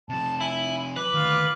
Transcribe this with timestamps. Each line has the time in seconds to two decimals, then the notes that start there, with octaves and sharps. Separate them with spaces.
0.09 C3 F3 A5
0.41 E4 G#5
0.96 B4 D6
1.13 D2 D#3 F4 F6